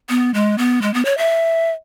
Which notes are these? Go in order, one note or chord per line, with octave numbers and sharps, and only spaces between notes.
B3
G#3
B3
G#3
B3
C#5
E5